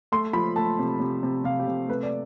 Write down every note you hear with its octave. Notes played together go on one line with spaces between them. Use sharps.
A3 C6
F3 B5
A3 A5
C3
C3
C3
C3 F5
G4
C3
A3 B4
D5